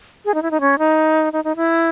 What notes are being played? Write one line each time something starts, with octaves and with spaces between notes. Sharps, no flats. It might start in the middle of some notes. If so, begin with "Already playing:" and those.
G#4
D#4
E4
D#4
C#4
D#4
D#4
D#4
E4